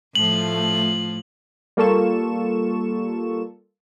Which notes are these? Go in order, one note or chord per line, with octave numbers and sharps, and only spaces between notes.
A2 F3 A3 F4 F#7
G3 A#3 F4 A4 C#6 E7